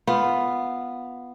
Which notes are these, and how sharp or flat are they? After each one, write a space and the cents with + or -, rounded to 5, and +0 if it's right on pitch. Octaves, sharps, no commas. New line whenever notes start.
B3 +0 F4 +0